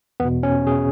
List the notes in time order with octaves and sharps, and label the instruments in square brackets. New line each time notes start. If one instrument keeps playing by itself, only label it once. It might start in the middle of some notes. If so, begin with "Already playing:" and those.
[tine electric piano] E2 B2 B3
C#4
B2 G#4